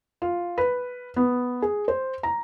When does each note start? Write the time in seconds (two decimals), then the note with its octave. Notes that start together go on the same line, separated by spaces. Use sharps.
0.22 F4
0.58 B4
1.16 B3
1.62 G#4
1.88 C5
2.23 A#5